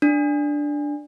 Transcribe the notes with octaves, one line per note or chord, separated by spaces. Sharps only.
D4